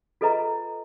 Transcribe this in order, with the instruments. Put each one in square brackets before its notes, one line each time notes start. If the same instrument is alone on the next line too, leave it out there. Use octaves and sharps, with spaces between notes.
[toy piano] F4 A4 B4 D#5 A#5